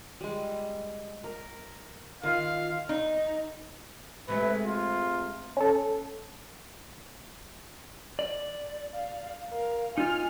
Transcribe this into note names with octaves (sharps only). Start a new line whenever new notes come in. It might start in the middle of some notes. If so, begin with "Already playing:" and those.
G3 G#3
A#4
D#3 F4 F5
D#4
C3 G#3 A3 B4
F4
C#4 A4
D5
F5
A#4 F5
D#4 F4 G#5 F6